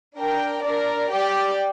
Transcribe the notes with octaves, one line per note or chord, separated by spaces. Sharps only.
D4 A#4 G5
D4 A#4 D5
G4 D5 G5